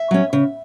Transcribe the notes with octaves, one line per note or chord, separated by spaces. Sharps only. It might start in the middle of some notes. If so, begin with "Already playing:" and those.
Already playing: E5
F#3 C#4
C#3